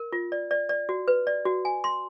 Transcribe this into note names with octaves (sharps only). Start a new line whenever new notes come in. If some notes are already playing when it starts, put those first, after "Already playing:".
Already playing: A#4
F4
D5
D5
D5
F#4
B4
D5
F#4
G#5
C6